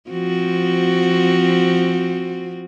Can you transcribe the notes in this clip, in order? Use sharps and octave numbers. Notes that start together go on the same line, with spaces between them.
F3 C4 F#4